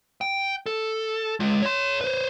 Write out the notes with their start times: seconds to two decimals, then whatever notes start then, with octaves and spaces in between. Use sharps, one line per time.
0.21 G5
0.66 A4
1.40 G#3 F4
1.62 C#5 C6
2.01 B4 C5